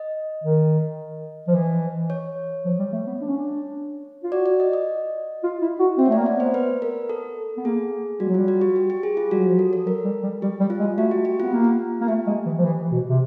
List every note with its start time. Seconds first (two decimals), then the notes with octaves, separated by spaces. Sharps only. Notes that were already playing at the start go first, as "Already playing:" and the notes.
Already playing: D#5
0.44 D#3
1.48 F3
1.54 E3
2.10 C#5
2.65 F3
2.79 G3
2.93 A3
3.07 B3
3.21 D4
3.29 C#4
3.37 D4
4.24 F4
4.32 F#4 D5
4.46 D5
4.60 D#5
4.73 D#5
5.44 F4
5.62 E4
5.79 F#4
5.98 C4 E5
6.06 C#5
6.09 A3 D5
6.18 A#3
6.26 B3 D5
6.40 C5
6.54 B4
6.82 A#4
7.09 A4
7.57 B3
7.65 A#3 G#4
8.20 G3 F#4
8.29 F#3
8.34 G3 F4
8.48 F#4
8.61 G4
8.76 G4
8.90 G4
9.03 G#4
9.17 F4
9.31 G3 F#4
9.39 F#3
9.48 F3
9.55 F#3 A4
9.73 A4
9.86 F#3 A#4
10.05 G3
10.23 G3
10.42 G3 G4
10.60 G3
10.70 F4
10.80 G#3
10.98 A3 F#4
11.11 G4
11.25 G4
11.40 B3 F4
11.53 A#3
11.65 F4
12.01 A#3
12.08 A3 G4
12.27 G#3
12.46 E3
12.58 F3
12.64 E3
12.92 B2
13.09 C3